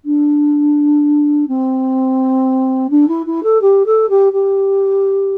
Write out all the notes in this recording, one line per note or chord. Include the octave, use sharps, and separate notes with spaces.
D4
C4
D4
E4
E4
A4
G4
A4
G4
G4